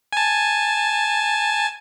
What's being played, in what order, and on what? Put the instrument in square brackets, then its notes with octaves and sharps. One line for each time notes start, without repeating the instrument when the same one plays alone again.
[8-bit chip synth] G#5 A5